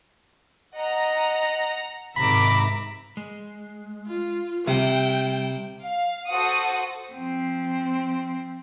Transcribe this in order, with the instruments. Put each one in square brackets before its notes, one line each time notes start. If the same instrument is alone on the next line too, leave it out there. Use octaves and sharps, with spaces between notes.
[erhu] D#5 [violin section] F#5 A#5
[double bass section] G#2 C3 D#3 [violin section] E5 D6 [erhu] A#5 [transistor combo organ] B5
[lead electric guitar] G#3
[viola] F4
[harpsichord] C3 [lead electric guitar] G3 [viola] G5
[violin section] F5
F#4 A4 C5 F#5 D#6
[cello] F3 C4